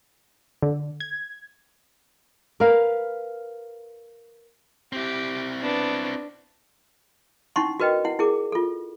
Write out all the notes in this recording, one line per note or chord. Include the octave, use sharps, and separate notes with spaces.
D3
G#6
A#4 B4 F5
C4 E4 G4
B3 D4
C#4 D#4 E4 F#5 C6 C#6
F#4 A#4 B4 D#5 G5
E4 F#5
E4 G#4 A#4 D6
F4 A4